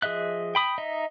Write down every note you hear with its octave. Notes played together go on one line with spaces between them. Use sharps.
F3 G#4 D#5 E5 F#6
G5 B5 D#6
D#4 D#5 E5